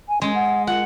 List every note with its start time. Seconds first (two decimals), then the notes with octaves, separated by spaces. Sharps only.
0.09 G#5
0.22 G#3 C#4
0.35 F#5
0.67 F4 F#5